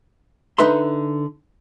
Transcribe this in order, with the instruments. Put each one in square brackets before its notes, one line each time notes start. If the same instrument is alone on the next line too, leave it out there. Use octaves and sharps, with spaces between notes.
[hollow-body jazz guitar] D3 D#4 B4 E5 C6